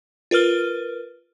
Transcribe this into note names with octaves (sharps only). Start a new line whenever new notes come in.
F4 A#4 B4 F6 G7